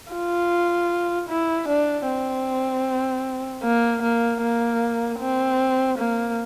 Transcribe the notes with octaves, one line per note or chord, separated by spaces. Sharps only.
F4
E4
D4
C4
A#3
A#3
A#3
C4
A#3